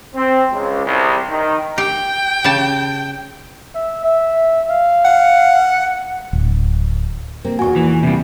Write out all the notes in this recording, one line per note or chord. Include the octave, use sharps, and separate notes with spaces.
C4
C#2
C2
D#3
G4 G5
C#3 G4 A5
E5
E5
F5
F#5
D1
C3 A#3 C4
E2 A#2 F#4 G#5 C#6
E3
C3 G3